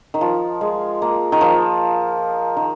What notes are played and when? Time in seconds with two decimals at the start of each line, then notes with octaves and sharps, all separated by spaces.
0.14 D#3
0.21 F3
0.61 G#3
1.02 A#3
1.32 D#3
1.41 F3
2.57 D#3